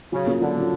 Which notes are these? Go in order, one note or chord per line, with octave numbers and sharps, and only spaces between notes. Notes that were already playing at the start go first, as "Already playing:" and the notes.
C#3 F#3
A#3 C#4 F4
D3 F#3
A#3 C#4 F4